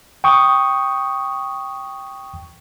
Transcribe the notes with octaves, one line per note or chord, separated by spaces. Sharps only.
G5 C#6 D#6